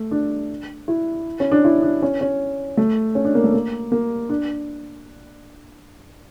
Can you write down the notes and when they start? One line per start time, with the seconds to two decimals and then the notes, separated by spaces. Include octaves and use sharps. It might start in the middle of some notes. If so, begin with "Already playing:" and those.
Already playing: A3
0.11 D4
0.88 E4
1.40 C#4
1.52 D4
1.64 E4
1.82 D4
2.02 C#4
2.21 C#4
2.77 A3
3.15 C#4
3.25 D4
3.35 A#3
3.44 A3
3.54 A#3
3.92 A#3
4.29 D4